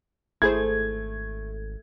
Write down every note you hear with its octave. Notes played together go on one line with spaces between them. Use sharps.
G#1 A3 E4 G#4 C5 G#6